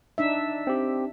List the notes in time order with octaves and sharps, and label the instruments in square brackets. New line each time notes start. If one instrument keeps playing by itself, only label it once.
[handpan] D4 D#4 E5
[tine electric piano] C4 G4